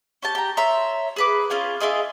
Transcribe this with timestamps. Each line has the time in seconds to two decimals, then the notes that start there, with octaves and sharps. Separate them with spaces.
0.22 C#4 G4 A5
0.35 G4 A#5
0.57 C#5 E5 A#5 C6
1.16 G#4 B4 D6
1.50 C#4 F4 G#4 F5
1.81 E4 F4 G#4 D#5